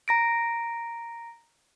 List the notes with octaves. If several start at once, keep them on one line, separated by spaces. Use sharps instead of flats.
A#5 A#6 D7